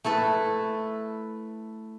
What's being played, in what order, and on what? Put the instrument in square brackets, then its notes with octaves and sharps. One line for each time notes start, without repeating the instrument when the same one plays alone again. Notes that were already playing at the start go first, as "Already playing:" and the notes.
[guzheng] A3 E4 A4 B4